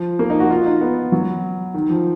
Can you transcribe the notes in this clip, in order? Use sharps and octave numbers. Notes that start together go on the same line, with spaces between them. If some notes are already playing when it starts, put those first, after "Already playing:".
Already playing: F3
A#3
D#4
F#4
F4
D#4
B3
F#3
D#3
F3